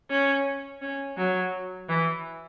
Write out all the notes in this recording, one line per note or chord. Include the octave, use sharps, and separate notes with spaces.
C#4
C#4
F#3
E3